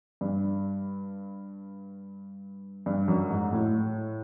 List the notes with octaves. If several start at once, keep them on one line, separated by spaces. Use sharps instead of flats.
G2
G2
F#2
G#2
A2